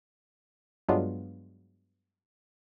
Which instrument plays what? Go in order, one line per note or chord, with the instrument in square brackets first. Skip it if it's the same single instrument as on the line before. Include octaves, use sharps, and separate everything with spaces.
[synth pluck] G2 F#3 G#3 B3 D4 F4